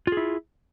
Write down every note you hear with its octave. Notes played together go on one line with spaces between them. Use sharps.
E4 F4 G#4